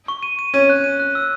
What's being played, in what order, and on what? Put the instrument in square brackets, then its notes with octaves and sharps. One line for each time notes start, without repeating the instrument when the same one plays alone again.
[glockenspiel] C#6
D#7
D#7
[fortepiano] C#4 [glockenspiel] D#7
[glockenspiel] F#6
D#7
F#6
E6